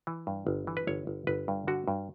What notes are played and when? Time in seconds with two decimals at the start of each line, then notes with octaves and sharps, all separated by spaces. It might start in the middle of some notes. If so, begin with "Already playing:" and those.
0.07 E3
0.27 G2
0.47 G1
0.67 E3
0.77 B4
0.87 G1 C#5
1.07 G1
1.27 G1 B4
1.48 G2
1.67 D3 F#4
1.88 G2